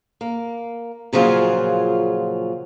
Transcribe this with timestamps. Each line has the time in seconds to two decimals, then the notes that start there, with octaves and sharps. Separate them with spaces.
0.21 A#3
1.13 A#2 C#3 F3 F#3 F4 G#4